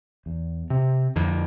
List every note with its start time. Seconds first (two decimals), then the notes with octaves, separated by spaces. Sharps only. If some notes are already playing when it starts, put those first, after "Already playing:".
0.26 E2
0.70 C3
1.16 F2 D3